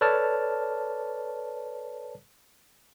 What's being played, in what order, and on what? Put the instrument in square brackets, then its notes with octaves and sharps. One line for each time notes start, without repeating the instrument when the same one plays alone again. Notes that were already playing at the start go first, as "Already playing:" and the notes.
[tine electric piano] A4 B4 C#5 D5 A5 F6